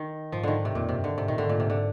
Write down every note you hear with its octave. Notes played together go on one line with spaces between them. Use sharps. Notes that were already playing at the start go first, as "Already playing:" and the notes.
Already playing: D#3
G#2 F3
D3 D#3
C3
F2 A#2
C3
G2
D3
G#2 C3
A#2 D#3
G#2 D3
A#2
C3
D3